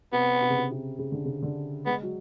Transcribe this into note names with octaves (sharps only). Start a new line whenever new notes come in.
C3 B3
C3
C#3
C3
C3
C#3
D3
C#3
D3
G#3 B3
F#3